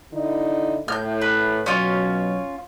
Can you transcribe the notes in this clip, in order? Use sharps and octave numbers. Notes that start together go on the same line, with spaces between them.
D3 D#4 E4
A2 F6 G6
B4
B2 F#3 C#4 F4 C#5